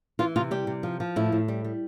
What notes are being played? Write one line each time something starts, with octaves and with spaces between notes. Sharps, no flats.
E3 F4
C3 F4
G3 G4
C3
F3
F3
A2 E4
A2
G3
G3